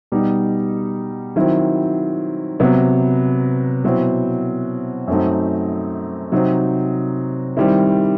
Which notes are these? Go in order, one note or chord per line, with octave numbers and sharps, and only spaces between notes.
B2 G3 D#4
D#3 F#3 C4 E4
C3 F#3 B3
B2 F#3 C4 E4
F#2 F#3 A3 C4 D#4
C3 F#3 C4 D#4
D#3 G3 C4 E4